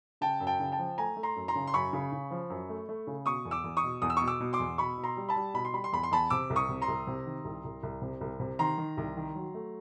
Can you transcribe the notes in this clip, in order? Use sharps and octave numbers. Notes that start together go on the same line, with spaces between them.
C#3 G5 A5
F#2
G5 A5
C#3
G5 A5
F3
A3 G#5 A#5
A3
A#5 C6
F#2
A#5 C6
C#3
C6
F#2 B5 C#6
C#3
C#3
F3
F#2
A3
A3
C#3
B2 C#6 D#6
E2
D6 E6
E2
C#6 D#6
B2
E2 D#6
E6
B2 C#6 D#6
D6 E6
B2
C6 D6
E2
B2 B5 C#6
B2
A#5 C6
G3
A5 B5
G3
B2 B5
C6
G3 B5
C6
E2 B5
C6
E2 A5 B5
C3 D6 E6
C2
C#6 D#6
C3
A#5 C6
C2
C3
D#3
C2
C2
C2
C3
C2
C3
D#3 A#5 C6
D#3
C2
D#3
F#3
A3